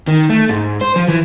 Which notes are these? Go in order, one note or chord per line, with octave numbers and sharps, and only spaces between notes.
D#3
A3
G#2
C5
F3
E3